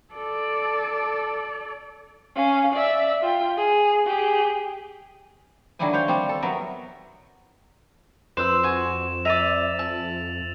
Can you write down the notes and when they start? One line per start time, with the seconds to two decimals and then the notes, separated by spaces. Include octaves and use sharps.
0.14 A4 D5
2.36 C#4 F5
2.72 D5 E5
3.22 F4 G5
3.57 G#4
4.06 G4 G#4
5.79 D3 D#3 F#3 G3 E4 G#5
5.93 C5 C#5 F5 G5
6.08 G3 C4 A5
6.29 A4
6.42 F#3 B3 A#4 E5
8.37 F2 B4 C5 E6 E7
8.63 F#4 G#5
9.25 D5 E5 A#5 A6 D#7 F7
9.79 A5 E6